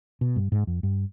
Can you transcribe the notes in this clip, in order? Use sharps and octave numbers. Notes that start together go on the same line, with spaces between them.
B2
G2
G#2
F2
G2